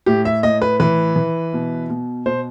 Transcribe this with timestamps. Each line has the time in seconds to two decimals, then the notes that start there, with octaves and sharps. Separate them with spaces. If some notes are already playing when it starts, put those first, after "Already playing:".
0.06 A2 G4
0.25 E5
0.43 A2 D#5
0.62 B4
0.80 E3 B4
1.16 E3
1.54 B2
1.90 B2
2.26 B2 C5